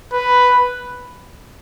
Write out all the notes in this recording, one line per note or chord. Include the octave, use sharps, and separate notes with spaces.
B4